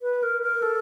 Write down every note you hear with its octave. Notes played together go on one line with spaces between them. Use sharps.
B4
A#4
A#4
A4